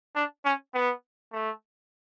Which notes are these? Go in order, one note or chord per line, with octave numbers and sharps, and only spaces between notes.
D4
C#4
B3
A3